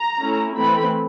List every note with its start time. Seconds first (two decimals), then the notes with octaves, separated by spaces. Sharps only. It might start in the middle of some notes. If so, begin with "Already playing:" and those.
Already playing: A#5
0.21 A3 C#4 E4
0.57 E3 A3 C4 B5